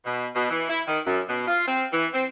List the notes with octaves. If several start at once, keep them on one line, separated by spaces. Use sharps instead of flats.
B2
B2
E3
E4
D#3
F#2
B2
F4
C4
E3
C4